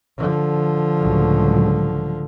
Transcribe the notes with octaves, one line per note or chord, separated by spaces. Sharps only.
D3 F3
C#2 A2 F#3